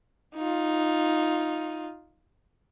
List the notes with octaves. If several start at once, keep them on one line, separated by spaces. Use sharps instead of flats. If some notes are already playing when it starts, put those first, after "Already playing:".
D#4 F4